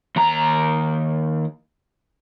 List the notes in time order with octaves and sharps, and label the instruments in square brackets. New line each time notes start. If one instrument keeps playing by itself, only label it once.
[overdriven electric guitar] D#2 A#5